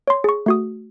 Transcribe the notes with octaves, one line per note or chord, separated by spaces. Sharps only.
C#5 C6
G#4 C#6
A3 F#4 D#6